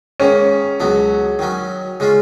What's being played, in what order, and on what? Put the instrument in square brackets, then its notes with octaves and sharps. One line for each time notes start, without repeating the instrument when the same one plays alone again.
[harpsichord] G#2 D#3 A#3 [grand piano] C#4
[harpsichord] C#2 B2 F#3 B3
D#3 F#3 C#4
C#3 G#3 C#4 F4